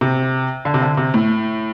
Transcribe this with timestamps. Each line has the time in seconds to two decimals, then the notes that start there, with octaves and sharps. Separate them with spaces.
0.01 C3
0.65 D3
0.74 C3
0.82 D3
0.97 C3
1.14 A2